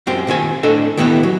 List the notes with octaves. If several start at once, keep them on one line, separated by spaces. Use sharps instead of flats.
F#2 C4 G4
A#2 D#3 C4 G#5
A2 D4 A4 D#5
D#3 E3 B3 E4 G4
F#3